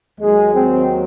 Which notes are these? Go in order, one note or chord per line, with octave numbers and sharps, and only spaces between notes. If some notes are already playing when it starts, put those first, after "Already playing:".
D#2 D#3 F#3 G#3
C4